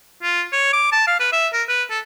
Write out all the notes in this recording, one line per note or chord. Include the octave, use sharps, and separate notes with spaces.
F4
C#5
D6
A5
F5
B4
E5
A#4
B4
A4